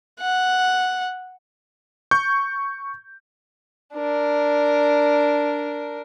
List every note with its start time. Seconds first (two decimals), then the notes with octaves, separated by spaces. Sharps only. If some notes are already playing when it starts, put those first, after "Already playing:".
0.20 F#5
2.11 C#6 G6
3.95 D4 A#4